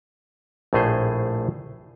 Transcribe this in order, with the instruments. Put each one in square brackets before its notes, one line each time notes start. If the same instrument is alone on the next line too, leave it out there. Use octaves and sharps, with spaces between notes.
[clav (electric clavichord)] A#1 A2 A3 G#4 C5